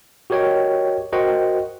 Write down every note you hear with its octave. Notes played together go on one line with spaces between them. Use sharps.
F#4 G4 A#4 C#5 D#5 G5
F#4 A#4 C5 D#5 F#5 G5